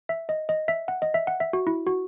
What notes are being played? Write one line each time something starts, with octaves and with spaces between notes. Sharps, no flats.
E5
D#5
D#5
E5
F#5
D#5
E5
F#5
E5
F#4
E4
F#4